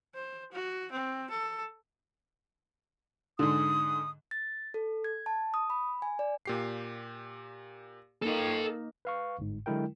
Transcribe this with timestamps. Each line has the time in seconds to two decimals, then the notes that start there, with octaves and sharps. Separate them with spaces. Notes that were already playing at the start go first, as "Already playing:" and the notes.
0.15 C5
0.53 F#4
0.92 C4
1.31 A4
3.39 G#2 D3 D#6
4.31 A6
4.74 A4
5.04 G#6
5.26 A5
5.54 D#6
5.70 B5
6.02 G#5
6.19 D5
6.45 A#2 G4 C7
8.22 A#3 D#4 A4 G5
9.05 B4 F5 C#6
9.39 G1 G#2
9.66 D3 F#3 G#3 E4 A#4 G5